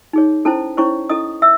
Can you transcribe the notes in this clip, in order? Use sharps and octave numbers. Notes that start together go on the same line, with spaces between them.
D#4 G#4 C#5
C#4 E4 A4 C5 A5
C#4 E4 C5 C#5 C#6
C#4 E4 A4 D#5 D#6
E5 E6